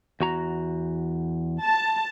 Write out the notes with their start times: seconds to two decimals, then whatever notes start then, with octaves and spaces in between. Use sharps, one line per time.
0.20 E2 F#4 A#5
1.61 A5